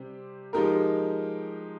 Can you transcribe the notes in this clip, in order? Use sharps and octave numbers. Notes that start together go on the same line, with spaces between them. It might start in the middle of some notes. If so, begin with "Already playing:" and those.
Already playing: C3 G3 C4 G4
F3 G#3 D#4 G4 A#4